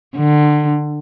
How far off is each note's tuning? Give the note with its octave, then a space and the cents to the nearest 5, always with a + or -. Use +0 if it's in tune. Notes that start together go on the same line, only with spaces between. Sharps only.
D3 +25